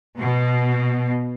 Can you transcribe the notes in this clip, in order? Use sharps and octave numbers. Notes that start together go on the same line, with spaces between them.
B2